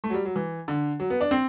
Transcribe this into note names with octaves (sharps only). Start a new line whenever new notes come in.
A3
F#3
G3
F#3
E3
D3
F#3
B3
D4
C4